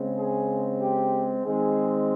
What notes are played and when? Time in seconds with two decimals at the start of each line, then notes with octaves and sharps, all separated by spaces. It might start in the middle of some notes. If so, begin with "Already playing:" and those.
Already playing: C#3 G#3 C4
0.17 G#4
0.80 G4
1.44 D#3 G#3 C4 G#4